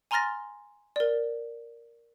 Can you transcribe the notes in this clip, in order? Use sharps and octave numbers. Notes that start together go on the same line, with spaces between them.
G#5 A#5 C6 F6 A6 A#6
A#4 D5